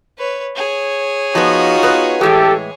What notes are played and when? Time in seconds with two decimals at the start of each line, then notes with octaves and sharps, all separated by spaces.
0.18 B4 C#5
0.56 G#4 C#5
1.35 F3 B3 D#4 F4 F#4
1.83 B3 B4
2.21 A2 E3 G#3 G4 A4